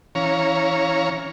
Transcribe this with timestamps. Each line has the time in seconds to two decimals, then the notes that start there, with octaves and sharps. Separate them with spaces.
0.15 E3 C#4 C#5 F5 A#5